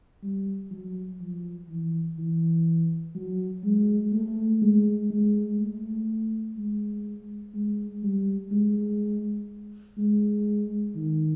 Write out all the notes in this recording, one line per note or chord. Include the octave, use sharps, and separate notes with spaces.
G3
F#3
F3
E3
E3
F#3
G#3
A3
G#3
G#3
A3
G#3
G#3
G3
G#3
G#3
D#3